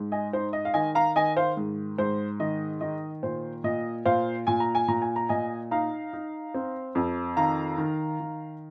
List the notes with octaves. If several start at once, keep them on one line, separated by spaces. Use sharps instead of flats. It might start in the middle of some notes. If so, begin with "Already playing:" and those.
Already playing: G#2
D#5 G#5
D#4 C5
D#5
F5
D#3 D#5 G#5
F5 A#5
D#3 D#5 G#5
C5 F5
G#2
G#2 C5
D#3 D#5
D#3 D#5
A#2 C5
A#2 D#5
A#2 C5 F5
A#2 G#5
A#5
G#5
A#2 A#5
G#5
A#5
A#2 D#5 G#5
D#4 F5 A#5
D#4
C4
F2
D#3 F5 A#5
D#3
D#3